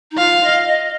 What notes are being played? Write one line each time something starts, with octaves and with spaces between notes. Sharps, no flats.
D#4
F4 F5
D#5
D#5